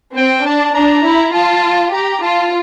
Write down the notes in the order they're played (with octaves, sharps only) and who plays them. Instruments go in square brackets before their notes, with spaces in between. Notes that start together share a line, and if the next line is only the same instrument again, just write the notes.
[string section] C4 [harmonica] G5
[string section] D4 [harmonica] A5
[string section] D4 [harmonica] A#5
[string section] E4
[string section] F4 [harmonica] A5
[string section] G4 [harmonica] A#5
[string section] F4 [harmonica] A5